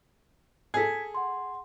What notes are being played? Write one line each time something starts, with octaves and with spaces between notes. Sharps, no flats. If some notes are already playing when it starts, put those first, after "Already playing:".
G#4 A4 G#6 B6
F#5 C6